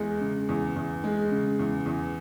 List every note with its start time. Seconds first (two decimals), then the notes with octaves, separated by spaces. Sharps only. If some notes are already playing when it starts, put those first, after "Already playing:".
Already playing: E2 G#3
0.21 C#3
0.49 E2
0.76 E2
1.04 G#3
1.31 C#3
1.59 E2
1.86 E2